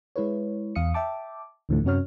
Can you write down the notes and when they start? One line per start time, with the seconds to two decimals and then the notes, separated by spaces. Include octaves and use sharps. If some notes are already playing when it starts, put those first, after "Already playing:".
0.16 G#3 E4 B4 C#5
0.75 E2 F5 D#6 C#7
0.94 E5 G5 A5 D6
1.69 D2 A2 D3 E3 F3 A3
1.84 F#2 C3 C#4 F#4 C#5 F6